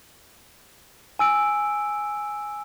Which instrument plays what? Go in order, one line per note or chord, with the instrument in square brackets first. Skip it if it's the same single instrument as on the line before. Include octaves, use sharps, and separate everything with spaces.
[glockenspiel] G#5 E6 D7